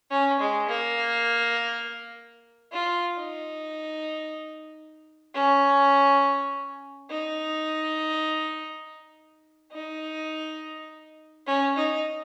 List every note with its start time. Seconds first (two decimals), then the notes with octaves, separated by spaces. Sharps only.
0.11 C#4
0.40 G#3
0.69 A#3
2.73 F4
3.16 D#4
5.35 C#4
7.10 D#4
9.72 D#4
11.47 C#4
11.77 D#4